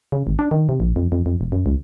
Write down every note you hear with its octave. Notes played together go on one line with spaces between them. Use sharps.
C#3
G#1
D4
D#3
C3
A#1
F2
F2
F2
E1
F#2
C#2